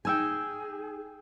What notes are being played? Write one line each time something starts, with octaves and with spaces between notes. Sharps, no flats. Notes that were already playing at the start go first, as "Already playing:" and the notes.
D#4 G#4 G5 G#5 E6 G#6